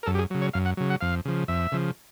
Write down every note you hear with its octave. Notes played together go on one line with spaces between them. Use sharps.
A#4
F#2 A4
G4
G#4
C#3 F#3
C#5
F#2 F5
F#5
C#3 F#3
F#5
F2 F5
C#3 F3
F2 E5
C#3 F3